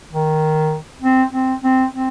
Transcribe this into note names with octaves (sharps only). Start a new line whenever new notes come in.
D#3
C4
C4
C4
C4